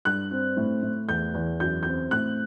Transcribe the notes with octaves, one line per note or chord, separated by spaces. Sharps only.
G2 F#6
C4
A2
A2
E2 G6
E2
F#2 G6
C4 G6
A2 F#6